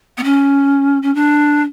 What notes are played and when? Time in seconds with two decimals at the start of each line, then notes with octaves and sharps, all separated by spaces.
0.17 B3
0.24 C#4
1.02 C#4
1.15 D4